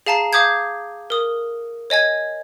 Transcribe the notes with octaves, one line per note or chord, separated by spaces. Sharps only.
G#4 F5 A5 A#5 C7
F5 D6 D#6 G6 G#6
A#4 D#6
C#5 D#5 G#5 G#6